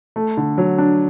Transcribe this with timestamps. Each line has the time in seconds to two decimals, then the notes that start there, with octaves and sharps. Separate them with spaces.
0.16 A3
0.37 D3
0.58 F#3
0.78 D4